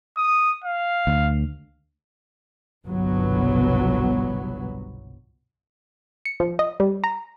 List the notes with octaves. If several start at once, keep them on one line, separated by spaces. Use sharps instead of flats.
D#6
F5
D2
G1 C2 B2 F#3 B3
C#7
F3
D#5
G3
A#5